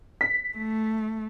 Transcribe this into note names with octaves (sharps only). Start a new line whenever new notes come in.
B6
A3